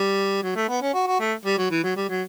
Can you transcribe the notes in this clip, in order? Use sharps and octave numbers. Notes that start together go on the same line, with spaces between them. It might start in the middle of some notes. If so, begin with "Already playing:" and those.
Already playing: G3
F#3
A3
B3
C#4
F#4
F#4
A3
G3
F#3
E3
F#3
G3
F#3